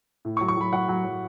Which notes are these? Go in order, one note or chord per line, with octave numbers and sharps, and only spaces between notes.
A2
C#6
F#3
C#6
F#3 B5
F#3 F#5
F#3
F#3